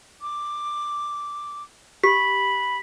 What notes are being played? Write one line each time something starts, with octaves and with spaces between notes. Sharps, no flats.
D6
G4 B5 B6